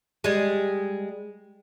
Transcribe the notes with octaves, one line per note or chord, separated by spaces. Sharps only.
G3 G#3